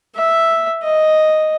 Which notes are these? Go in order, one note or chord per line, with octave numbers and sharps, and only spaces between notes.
E5
D#5